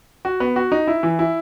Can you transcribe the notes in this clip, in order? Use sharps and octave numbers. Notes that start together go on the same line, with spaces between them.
F#4
B3
F#4
D#4
E4
E3
E4